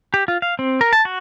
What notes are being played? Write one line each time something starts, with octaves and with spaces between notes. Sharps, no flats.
G4
F4
F5
C4
A#4
A5
F#4